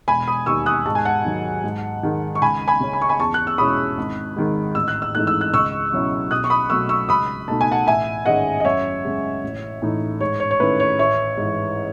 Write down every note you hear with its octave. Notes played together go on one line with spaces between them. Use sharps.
E1 G#5 B5
B5 D#6
D#2 D#3 C#6 E6
D#6 F#6
G#2 A5
G#5
F#5 A5
D#3 F#3
G#2
D#3 G#3 D#4
C#6
C#2 G#5 B5
G#5 B5
C#3 G#3 C#4
B5
C#6
G#5 B5
E2 A5 C#6
F#6
E6
B2 G#3 C#4 E4 B5 D#6
G#1
G#2 D#3 G#3
A1 E6
F#6
E6
G#2 E3 A3 D#4 F#6
E6
F#6
C#2 C#6 E6
B2 F#3 C#4 E4
B1 D#6 F#6
C#6
B5 D#6
B2 F#3 A3 C#6 E6
C#6 E6
C#2 B5 D#6
B2 A3 D#4 A5
G#5
F#5 A5
A1 E5 G#5
G#2 D#3 G#3 C#4 D#5 F#5
D#5
F#2 C#5 E5
C#3 G#3
A1
A2 E3 A3 D#4
G#2 C#5
C#5
C#5
D#3 A3 C#4 E4 B4
C#5
A1 C#5 E5
G#2
E3